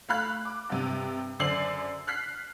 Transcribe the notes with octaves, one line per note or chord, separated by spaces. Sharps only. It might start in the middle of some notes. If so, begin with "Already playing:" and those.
A3 F5 B5 F#6
D6
G2 C3
F#2 D3 C5 D5 C7 F#7
F6 F#6 B6 C7